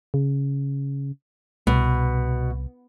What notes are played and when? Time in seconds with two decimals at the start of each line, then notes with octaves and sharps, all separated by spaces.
0.14 C#3
1.67 C2 B2